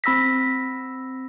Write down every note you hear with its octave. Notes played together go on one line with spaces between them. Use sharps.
C4 B5 E6 A#6 B6